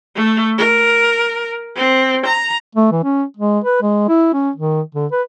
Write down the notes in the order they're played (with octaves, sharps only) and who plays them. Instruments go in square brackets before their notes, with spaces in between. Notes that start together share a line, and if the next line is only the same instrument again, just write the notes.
[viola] A3
A#4
C4
A#5
[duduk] A3
E3
C#4
G#3
B4
G#3
E4
C#4
D#3
D3
B4